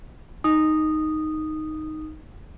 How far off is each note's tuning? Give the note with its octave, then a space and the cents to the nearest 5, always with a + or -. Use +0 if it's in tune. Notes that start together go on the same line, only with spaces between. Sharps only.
D#4 +0 D#6 -10